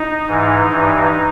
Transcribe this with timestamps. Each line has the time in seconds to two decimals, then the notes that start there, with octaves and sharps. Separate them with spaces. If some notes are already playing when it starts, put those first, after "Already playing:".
Already playing: D#4
0.27 G#2 E3
0.71 G2 E3